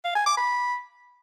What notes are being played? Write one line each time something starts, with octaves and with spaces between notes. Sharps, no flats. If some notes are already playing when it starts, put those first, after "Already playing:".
F5
G#5
D6
B5